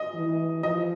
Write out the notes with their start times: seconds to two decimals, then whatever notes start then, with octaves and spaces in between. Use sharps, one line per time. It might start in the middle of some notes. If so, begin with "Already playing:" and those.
Already playing: D#5
0.14 E3
0.63 F3 D#5